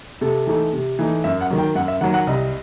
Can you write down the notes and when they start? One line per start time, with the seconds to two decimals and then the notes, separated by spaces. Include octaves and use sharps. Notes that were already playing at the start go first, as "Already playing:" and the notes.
0.21 C3 A4
0.47 E3 A3 D#4
0.73 C3
0.99 E3 A3 D#4
1.24 F#2 E5
1.41 F#5
1.50 D#3 F#3
1.58 G5
1.75 F#2 F#5
1.88 E5
2.01 D#3 F#3 F#5
2.14 F#5
2.27 C2 D#5